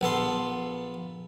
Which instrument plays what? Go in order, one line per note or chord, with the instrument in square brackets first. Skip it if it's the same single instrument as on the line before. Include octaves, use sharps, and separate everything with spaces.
[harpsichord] A#1 B3 A4 C6